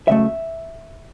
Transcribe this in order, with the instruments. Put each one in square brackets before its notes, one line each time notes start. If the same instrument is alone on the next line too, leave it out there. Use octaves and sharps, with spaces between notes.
[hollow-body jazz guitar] C#2 C#3 F#3 A3 E5